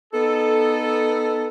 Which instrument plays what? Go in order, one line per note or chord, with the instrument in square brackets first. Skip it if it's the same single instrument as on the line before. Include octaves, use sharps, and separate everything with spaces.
[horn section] B3 D#4 A4